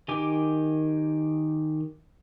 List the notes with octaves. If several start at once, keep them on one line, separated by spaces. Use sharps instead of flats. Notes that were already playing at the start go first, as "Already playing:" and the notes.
D#3 G4 G#5 D6